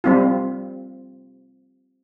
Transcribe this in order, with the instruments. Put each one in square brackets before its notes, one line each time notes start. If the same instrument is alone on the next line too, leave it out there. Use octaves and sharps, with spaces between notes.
[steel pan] G3 C4 F4